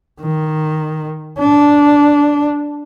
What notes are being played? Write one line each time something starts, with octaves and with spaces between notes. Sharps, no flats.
D#3
D4